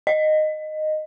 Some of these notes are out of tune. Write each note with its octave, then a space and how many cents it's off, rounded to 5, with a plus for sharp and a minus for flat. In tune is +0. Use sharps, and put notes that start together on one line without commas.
D#5 -10